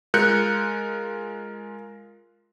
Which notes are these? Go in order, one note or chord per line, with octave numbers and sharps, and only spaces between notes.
G#3 F4 A#4 F#6 G6 C#7